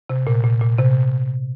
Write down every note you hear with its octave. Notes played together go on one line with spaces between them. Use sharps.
C3
A#2
A#2
A#2
C3